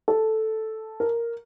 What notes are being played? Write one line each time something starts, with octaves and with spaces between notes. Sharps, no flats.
A4
A#4